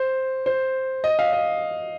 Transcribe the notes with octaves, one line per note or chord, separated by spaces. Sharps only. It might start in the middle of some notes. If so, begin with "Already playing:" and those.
Already playing: C5
C5
D#5
F5
D#5